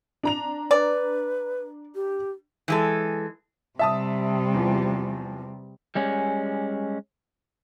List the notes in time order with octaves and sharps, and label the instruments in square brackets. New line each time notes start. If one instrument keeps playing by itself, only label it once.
[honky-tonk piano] D4 A#5 F7
[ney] B4 [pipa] D5
[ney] G4
[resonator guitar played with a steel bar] E3 G#3 A4
[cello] C3 G3 [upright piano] E5 A5 D#6
[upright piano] E2 F3
[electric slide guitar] G3 G#3 C#4